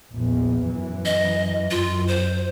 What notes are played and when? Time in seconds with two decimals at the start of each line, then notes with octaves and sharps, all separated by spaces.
0.11 A#1 E2
0.66 F#2 E3
1.05 D#5
1.71 F#2 F4
2.08 C5